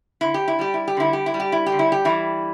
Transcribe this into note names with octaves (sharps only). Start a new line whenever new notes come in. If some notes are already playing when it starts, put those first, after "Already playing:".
D3 E4
G4
E4
G3 G4
E4
G4
D3 E4
G4
E4
G3
G4
E4
G4
D3
E4
G4
E3 G3 E4